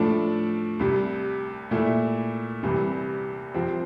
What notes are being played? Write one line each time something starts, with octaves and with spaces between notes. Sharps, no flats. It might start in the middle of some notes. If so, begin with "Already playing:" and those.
Already playing: A2 F3 A3 D4
C2 C3 G3
A#2 A3 E4
C2 C3 E3 G3
C2 C3 F3 C4